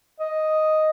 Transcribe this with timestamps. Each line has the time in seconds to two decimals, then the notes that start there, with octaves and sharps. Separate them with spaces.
0.20 D#5